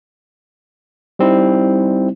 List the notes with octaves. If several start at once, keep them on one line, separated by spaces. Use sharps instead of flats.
G3 C4 D#4 E4